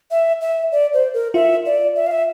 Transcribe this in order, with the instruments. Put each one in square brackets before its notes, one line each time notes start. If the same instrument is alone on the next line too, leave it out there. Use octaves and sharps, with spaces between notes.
[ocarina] E5
E5
D5
C5
A#4
[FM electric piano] F4 [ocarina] E5
[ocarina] D5
E5
F5
E5